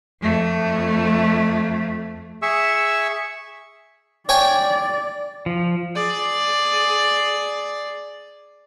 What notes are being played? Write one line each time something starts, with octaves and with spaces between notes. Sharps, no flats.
F2 A3
G#4 E5 C#6 E6
C#5 D5 G5 G#5
F3
G#4 D5